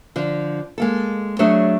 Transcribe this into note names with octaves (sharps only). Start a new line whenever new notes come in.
D3 F3
G#3 A#3 A4
F#3 A3 D4 F#4 G#4 C#5